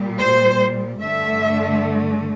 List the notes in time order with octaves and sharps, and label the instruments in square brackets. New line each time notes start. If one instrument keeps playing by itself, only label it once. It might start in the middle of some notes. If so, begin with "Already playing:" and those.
Already playing: [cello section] A#2 G3
C5
G2 D3 A3 E5